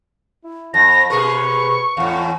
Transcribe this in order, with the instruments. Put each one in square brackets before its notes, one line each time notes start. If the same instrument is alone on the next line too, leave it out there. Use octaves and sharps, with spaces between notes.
[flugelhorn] E4
[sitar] F2 [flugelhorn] A5 [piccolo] A#6
[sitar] B2 G#4 A#4 [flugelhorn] B4 [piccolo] C#6
[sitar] E2 A2 [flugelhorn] F5